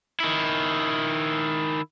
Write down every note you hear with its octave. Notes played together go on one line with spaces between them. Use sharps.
D#3 E4